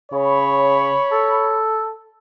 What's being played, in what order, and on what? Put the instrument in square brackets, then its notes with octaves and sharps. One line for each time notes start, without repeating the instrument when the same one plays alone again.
[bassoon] C#3 [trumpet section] C#5 B5
[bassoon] A4